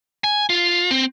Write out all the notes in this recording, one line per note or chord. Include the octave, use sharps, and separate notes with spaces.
G#5
F4
C4